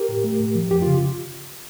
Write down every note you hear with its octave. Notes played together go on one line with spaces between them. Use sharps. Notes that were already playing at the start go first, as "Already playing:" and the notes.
Already playing: G4 A#4
A2
A3
A2
F3
F2 G4
C#3 F4